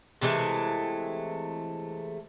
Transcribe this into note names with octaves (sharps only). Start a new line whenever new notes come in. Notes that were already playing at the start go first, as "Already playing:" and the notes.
C3 E3 G#3 A3